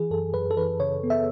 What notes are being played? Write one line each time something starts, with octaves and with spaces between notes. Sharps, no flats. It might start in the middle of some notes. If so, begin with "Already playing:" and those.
Already playing: E3 G#4
F#2 A4
F#2 B4
A4
E3 B4
C#3 C#5
B3
E5